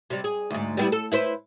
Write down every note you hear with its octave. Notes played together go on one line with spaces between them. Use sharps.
C3 G3
G#4
D2 G#2
G3 B3 E4
A4
E4 B4 C5